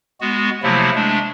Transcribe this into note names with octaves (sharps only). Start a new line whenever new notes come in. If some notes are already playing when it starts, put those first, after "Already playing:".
G#3 B3 F#4
C3 F3 F#3 A3 A#3 E4
G#3 A3 D4